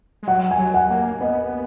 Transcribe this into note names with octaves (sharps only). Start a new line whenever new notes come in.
G#3
F#3 F#5
G#5
F#3
F#5
A#3
B3 D#5